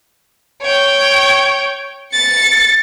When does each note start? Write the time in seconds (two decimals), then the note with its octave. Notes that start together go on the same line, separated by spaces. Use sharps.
0.62 C#5 G5
2.13 A6 C#7